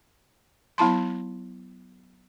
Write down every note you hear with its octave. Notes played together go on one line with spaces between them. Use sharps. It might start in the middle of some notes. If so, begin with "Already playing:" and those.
F#3 B3 E4 A5 C6